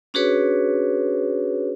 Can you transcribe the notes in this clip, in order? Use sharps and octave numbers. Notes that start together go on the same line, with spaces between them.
C#4 D4 F#4 G#4 B4 C#5